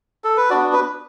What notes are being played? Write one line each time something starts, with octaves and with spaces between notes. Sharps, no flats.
A4
B4
B3 D4 F#4 D5
B4